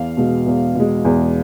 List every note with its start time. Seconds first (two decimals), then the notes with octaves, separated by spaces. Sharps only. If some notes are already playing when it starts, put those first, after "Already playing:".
Already playing: E2 F5
0.17 B2 G#3
0.46 E2
0.75 B2 G#3
1.05 E2